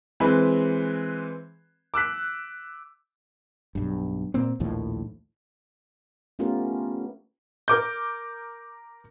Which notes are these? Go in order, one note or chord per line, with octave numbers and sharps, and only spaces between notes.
E3 G#3 C4 B4
D6 E6 F#6 B6
B1 G2
A#2 A#3 C4
A#1 D#2 A2 F3
A3 B3 C#4 F4 G4 A#4
A#4 D6 G6